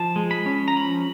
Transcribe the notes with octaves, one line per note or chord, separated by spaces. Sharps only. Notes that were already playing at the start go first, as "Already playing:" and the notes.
Already playing: F3 A5
G#3
B5
C#4
A#5
F3 B5